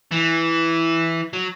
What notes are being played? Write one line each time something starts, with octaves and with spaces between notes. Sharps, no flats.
E3
F#3